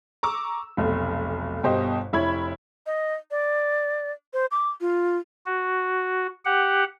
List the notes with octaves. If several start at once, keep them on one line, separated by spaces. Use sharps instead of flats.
A#5 C#6 D6 E6
F1 B1 A3
G1 B2 G4 C5 D#5
F1 E4 C#5 B5 G#6
D#5
D5
C5
D6
F4
F#4
G4 F#5